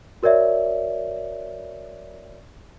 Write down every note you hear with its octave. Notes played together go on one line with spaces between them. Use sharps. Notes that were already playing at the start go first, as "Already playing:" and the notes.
F#4 A#4 C#5 D5 E5